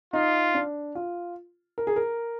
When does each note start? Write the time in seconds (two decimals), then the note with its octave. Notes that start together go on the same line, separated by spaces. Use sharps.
0.13 D#4 F4
0.54 D4
0.95 F4
1.78 A#4
1.87 G#4
1.96 A#4